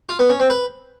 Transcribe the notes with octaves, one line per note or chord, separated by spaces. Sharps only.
F4
B3
C#4
C4
B4